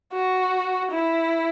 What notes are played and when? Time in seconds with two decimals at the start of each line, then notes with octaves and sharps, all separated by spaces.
0.13 F#4
0.91 E4